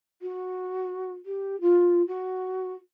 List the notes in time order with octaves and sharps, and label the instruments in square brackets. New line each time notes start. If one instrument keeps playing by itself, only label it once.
[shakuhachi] F#4
G4
F4
F#4